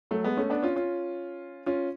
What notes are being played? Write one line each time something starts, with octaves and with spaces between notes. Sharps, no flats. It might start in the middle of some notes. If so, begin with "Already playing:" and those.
F#3 A3
G#3 B3
A3 C#4
B3 D4
C#4 F4
C#4 F4
C#4 F4